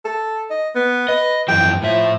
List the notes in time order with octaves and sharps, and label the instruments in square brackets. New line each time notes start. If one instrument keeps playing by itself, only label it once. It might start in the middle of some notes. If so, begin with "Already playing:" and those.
[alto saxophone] A4
D#5
B3
[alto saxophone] B4 [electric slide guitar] D#5
[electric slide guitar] F#2 E3 F3 [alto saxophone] G5
[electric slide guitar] A2 E5 [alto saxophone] F3